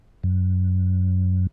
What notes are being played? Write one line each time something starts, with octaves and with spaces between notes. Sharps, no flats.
F#2